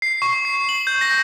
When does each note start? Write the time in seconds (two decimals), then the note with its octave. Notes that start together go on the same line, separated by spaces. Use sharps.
0.02 C7
0.22 C#6
0.45 C7
0.69 F#7
0.87 G6
1.01 A#6